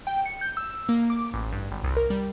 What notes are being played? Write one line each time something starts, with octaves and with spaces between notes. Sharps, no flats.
G5
C#7
G6
E6
A#3
D6
A1
G2
G#1
C2
A#4
G3